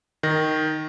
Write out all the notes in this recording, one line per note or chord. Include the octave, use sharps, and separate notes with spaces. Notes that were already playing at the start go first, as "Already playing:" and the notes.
D#3 A#6